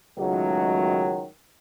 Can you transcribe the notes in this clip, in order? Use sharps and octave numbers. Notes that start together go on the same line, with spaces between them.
C#2 A2 D#3 F#3